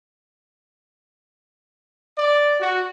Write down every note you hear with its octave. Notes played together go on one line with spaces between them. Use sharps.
D5
F#4